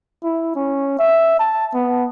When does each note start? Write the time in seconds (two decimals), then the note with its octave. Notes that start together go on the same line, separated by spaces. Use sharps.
0.23 E4
0.56 C#4
0.99 E5
1.39 A5
1.74 B3